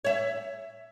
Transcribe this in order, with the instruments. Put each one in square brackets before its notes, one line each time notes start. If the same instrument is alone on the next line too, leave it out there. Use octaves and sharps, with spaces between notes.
[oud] C#5 E5